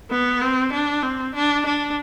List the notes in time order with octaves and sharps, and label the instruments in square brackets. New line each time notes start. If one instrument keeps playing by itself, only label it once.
[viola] B3
C4
D4
C4
D4
D4